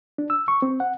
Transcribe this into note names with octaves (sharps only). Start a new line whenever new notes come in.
D4
E6
C#6
C4
F#5